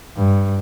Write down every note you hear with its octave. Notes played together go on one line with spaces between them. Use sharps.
G2